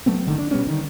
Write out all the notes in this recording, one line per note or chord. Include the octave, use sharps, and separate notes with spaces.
F#3 A3 B3 C4
G1 D3 D#3
D4
B2 G3 B3 C#4
D3 D#3